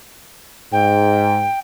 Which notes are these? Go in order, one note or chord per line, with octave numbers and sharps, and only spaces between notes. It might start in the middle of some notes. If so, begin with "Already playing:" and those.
G#2 G5